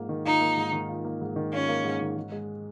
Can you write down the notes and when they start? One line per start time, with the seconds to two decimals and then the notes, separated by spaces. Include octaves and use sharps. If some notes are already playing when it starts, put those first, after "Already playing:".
Already playing: G#2 A#3 F4
0.09 D#3
0.25 D#4 F4
0.41 A#3
0.57 G#2
0.72 D#3
0.89 F4
1.05 A#3
1.21 G#2
1.36 D#3
1.53 C#4 F4
1.69 A#3
1.84 G#2
2.01 D#3
2.16 G#2
2.32 G#3